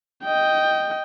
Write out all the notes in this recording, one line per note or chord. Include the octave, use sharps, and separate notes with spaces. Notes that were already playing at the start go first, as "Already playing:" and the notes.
D#5 G5